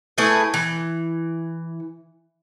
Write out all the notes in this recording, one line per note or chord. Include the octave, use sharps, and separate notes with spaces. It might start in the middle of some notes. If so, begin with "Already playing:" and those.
A3 E4 G#4 B4
E3